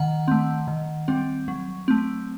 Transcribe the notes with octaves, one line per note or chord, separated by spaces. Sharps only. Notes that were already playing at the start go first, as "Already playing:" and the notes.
Already playing: D#3 F#5
A3 C4
D#3
G3 C4
F#3
A3 C4